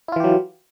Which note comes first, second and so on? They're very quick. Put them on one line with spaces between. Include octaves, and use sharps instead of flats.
E4 F4 E3 G4 F#3